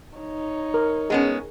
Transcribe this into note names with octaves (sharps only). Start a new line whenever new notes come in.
D#4 C#5
A#4
G#3 B3 C#4 G#4